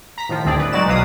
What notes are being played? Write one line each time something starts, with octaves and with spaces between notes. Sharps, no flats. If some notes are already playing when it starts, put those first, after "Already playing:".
A#5 B6
A2 D#3 F3
G1 D2 C4 G#4 D5
B4
F#3 G#3 D#4 F#4 D5 E7
B1 B2 F#3 B4 F5 D#6